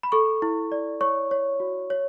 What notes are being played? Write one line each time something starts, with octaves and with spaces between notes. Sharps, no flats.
B5
A4 C#6
E4
D5
C#5 C#6
C#5
F#4
C#5